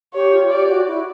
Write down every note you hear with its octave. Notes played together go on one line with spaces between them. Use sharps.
G4 C#5
F4
G4 D5
F#4
E4